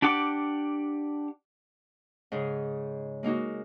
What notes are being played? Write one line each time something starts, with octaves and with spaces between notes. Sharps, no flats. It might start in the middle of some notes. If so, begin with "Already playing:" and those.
D4 G4 F#5 D6
G#2 C#3 D#4
G#3 A#3 D#4 F#4